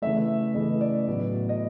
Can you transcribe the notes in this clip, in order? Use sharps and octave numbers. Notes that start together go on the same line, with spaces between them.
C#3 E3 A3 E5
C#3 E3 A3 D#5
D5
A2 F#3 B3
D#5